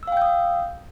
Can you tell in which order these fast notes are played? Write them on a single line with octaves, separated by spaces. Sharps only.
E6 F5 G5 G6 D#6